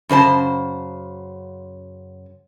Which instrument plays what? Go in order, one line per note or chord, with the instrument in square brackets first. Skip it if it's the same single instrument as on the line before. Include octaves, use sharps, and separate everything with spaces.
[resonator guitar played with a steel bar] F#2 C#3 C5 A5